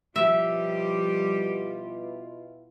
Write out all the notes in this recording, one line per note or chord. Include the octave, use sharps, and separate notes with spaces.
B2 F3 G3 E4 F4 G4 E5